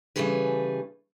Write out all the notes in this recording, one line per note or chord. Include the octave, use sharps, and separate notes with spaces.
C#3 E3 G3 A3 G#4 B4